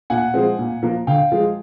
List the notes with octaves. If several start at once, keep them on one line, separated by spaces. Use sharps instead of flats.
A#2 F#5 G#5
F3 G#3 C4
A#2
F3 A#3
D3 F5 G5
F3 G#3